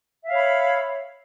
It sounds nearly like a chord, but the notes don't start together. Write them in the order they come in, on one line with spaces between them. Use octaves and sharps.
E5 F5 C#5 B5